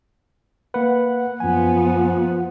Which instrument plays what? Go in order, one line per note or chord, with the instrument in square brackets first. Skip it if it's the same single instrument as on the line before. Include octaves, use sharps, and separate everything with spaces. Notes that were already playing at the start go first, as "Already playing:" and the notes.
[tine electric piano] A#3 B4 [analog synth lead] F#5
[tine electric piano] F#2 G#5 [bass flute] F3 [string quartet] B3